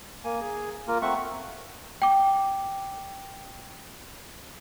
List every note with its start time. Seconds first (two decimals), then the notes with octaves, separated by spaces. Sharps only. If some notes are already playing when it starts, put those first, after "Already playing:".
0.24 A#3 G#5
0.41 G#4
0.88 A#3 F4 A#4
1.02 A3 C4 E5 F#5 C#6
2.02 G5 D6